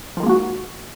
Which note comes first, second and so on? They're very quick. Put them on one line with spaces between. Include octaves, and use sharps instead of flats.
F3 D#3 G#3 A#3 F#4